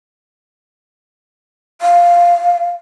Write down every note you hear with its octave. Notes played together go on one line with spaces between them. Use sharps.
F5